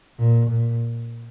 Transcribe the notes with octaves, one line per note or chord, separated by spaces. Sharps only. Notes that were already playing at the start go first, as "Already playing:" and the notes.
A#2
A#2